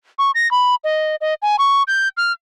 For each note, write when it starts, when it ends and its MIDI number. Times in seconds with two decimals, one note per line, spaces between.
0.18 0.31 85
0.35 0.50 94
0.51 0.75 83
0.84 1.16 75
1.21 1.34 75
1.42 1.56 80
1.59 1.83 85
1.87 2.08 91
2.17 2.32 89